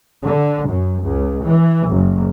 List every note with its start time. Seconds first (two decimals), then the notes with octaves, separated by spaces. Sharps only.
0.25 D3
0.69 F#2
1.04 C#2
1.43 E3
1.89 F#1